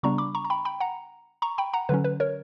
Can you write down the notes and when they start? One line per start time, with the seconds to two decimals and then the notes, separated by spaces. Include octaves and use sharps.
0.03 C#3 G3 B3 D4 A#5 C#6
0.18 B5 D6
0.35 A#5 C#6
0.45 A#5
0.50 G5 B5
0.65 G5 B5
0.80 F#5 A#5
1.42 A#5 C#6
1.58 G5 B5
1.73 F#5 A#5
1.89 D3 F#3 C#4 B4
2.04 B4
2.20 A#4 C#5